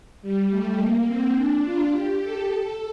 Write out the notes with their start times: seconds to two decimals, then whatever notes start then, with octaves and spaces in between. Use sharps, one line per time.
0.22 G3
0.50 A3
0.78 A#3
1.07 C4
1.35 D4
1.63 F4
1.91 G4
2.20 A4
2.48 A4